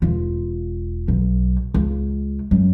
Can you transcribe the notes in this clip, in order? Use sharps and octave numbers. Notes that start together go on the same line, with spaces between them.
E1 F4
B1
C#2
F#2